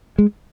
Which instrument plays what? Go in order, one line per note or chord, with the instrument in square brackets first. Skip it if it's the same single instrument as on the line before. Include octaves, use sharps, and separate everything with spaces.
[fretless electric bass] G#3